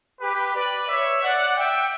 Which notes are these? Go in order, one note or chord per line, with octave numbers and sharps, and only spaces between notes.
G4 B4
B4 D5
C#5 E5
D5 F#5
E5 G5